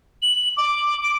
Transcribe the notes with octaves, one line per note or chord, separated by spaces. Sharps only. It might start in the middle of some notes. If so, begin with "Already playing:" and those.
F#7
D6
D7